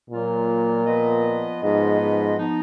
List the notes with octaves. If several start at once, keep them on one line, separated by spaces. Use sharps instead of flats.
A#2 F#3 A#3 F4
F3 B3 F4 B4 D#5
G#2 F3 B3 F4 B4 D#5
G#2
F3 B3 D#4